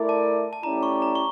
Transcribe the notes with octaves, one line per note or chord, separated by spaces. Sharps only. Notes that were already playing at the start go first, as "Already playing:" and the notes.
Already playing: A3 E4 A#4 D5
A5
A5
A3 C#4 E4 G4 D5 A#5
C#6
A#5
C#6